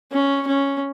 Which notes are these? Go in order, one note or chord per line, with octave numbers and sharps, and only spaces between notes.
C#4
C#4